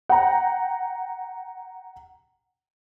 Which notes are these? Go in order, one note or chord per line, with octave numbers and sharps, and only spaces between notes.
F#5 G5 A#5